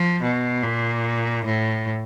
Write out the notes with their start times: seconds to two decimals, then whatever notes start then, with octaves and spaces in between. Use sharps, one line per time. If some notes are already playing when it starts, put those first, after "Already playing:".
Already playing: F3
0.22 B2
0.63 A#2
1.45 A2